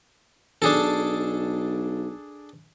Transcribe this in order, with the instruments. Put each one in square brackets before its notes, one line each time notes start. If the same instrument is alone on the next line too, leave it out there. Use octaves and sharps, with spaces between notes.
[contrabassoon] B1 [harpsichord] D4 G#4 A4